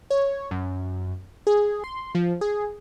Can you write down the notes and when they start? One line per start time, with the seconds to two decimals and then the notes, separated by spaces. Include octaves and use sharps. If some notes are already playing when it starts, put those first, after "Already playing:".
0.10 C#5
0.51 F#2
1.47 G#4
1.84 C6
2.15 F3
2.41 G#4